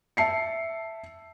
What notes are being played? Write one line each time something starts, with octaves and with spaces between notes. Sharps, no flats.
E5 A5 C7 C#7